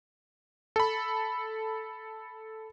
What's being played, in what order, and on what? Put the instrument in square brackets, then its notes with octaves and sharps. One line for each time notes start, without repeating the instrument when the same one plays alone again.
[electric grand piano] A4 B5